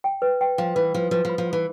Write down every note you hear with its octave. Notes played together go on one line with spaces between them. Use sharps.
G5
B4
G5
F3 F5
E3 B4
F3 B4
F3 B4
F3
B5
F3
F5
E3